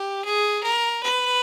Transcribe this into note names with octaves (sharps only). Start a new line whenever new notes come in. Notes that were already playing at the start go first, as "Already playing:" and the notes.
Already playing: G4
G#4
A#4
B4